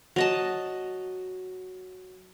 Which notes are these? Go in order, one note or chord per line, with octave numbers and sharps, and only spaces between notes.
F#3 D#5 A5